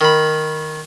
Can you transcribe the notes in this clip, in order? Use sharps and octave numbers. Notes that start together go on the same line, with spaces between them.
D#3 B5